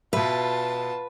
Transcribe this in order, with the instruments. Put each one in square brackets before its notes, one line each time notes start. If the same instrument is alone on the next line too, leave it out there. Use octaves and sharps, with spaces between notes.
[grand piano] B2 E5 [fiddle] F4 A5 [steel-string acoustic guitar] B4